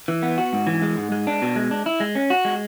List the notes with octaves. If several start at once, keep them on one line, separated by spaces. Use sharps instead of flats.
E3
B3
F#4
G#2
E3
G#3
G#2
G#3
D4
B2
G#3
D4
E4
G#3
C#4
F#4
G#3